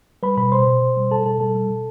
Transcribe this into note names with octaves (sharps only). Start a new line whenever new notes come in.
G3 B4 B5
B2 B4 B5
B2 C5 C6
B2
B2
G3
B2 A4 A5
B2 A4 A5
G3 A4 A5
G3
B2